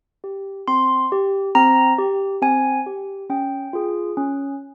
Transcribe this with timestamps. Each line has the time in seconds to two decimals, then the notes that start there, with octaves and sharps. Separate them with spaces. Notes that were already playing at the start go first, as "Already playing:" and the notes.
0.24 G4
0.68 C4 C6
1.12 G4
1.55 C4 A#5
1.98 G4
2.42 C4 G#5
2.86 G4
3.30 C#4 G5
3.73 F4 G#4
4.17 C#4